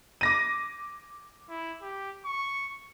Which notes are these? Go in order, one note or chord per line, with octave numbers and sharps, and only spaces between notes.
D6 A#6 D#7
E4
G4
C#6